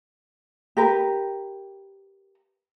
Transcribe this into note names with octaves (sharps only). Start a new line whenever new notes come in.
G4 A#4 B4